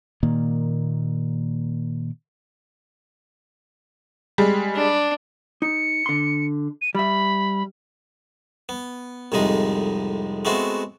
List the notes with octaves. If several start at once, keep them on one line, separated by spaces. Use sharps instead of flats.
A#2 D#3 A#3
G3 G#3
D4
D#4 C#7
D3 C6
D#7
G3 E5 B5
B3
C2 F2 A2 G#3 D#4 D#6
G#3 A3 B3 C4 E4 F#4